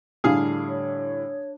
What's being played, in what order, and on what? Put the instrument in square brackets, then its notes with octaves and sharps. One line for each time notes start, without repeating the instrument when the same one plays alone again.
[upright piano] A2 D3 G3 [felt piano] D4 [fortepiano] G#4 F5
[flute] C#5